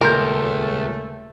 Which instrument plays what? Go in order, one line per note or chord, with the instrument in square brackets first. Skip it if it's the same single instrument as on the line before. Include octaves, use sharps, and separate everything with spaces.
[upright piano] D#1 C6 G6 [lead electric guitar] C#2 [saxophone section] A3 [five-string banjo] A#4